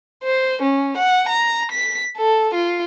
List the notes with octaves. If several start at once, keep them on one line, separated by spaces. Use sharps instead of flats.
C5
C#4
F#5
A#5
B6
A4
F4